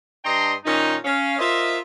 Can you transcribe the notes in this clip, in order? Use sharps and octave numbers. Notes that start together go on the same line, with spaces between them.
G2 D4 D#5 G5 A#5 C6
A#2 D#3 C#4 D#4
C#4 F5
F4 A#4 C5 D#5 E5